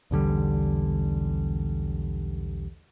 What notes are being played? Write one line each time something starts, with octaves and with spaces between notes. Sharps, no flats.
B1 E2 D3 G3